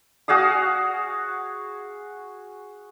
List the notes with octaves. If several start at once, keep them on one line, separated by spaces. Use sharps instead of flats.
F#4 G#4 F5 D#6